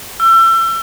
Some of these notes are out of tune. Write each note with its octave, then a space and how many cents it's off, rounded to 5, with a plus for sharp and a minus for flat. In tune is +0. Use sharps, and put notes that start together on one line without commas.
E6 +30